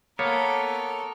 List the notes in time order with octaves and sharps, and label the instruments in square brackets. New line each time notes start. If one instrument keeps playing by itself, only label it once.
[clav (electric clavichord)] A#3 [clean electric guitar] B3 [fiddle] A4 A#4 [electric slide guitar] C#5